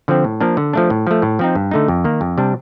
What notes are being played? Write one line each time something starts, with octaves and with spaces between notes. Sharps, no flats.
D3 F3 C4
A2
F3 A#3 D4
D3
F3 A3 D4
A2
F3 A3
A2
F3 C4 D#4
G2
D3 A3 D#4
F2
D#3 A#3
F2
C3 G3 D4